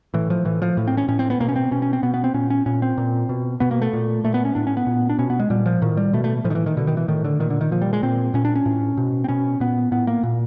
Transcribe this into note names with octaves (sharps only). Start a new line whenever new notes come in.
A2 E3
F3
A2 E3
F3
A2
C4
C#4
A2 C#4
C4
B3
B2 A#3
C#4
C4
B2 C#4
C#4
C4
B2 B3
B3
C4
A#2 C#4
C#4
A#2 C#4
C4
A#2
B2
B2 B3
A#3
A3
A#2
A#2 A3
B3
C#4
A2 D4
C#4
B3
A#2
D4
B2 C#4
B3
G#3
A#2 G3
F3
A2 D#3
G3
B2 A3
A3
A2 F3
D#3
E3
D#3
B2 D3
D#3
E3
A2 D#3
D3
A#2 D#3
D3
D#3
A#2 F3
G3
G#3
A#2 C4
A#2 C#4
D4
C#4
A2
B2
C4
B2 C#4
A#2 B3
A2 B3
A#3
A#2